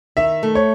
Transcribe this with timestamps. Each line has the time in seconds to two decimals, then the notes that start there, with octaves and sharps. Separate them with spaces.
0.17 D#3 E5
0.43 A3
0.55 C#5